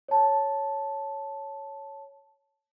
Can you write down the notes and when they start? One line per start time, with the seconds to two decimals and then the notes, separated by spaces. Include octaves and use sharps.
0.09 C#5 A5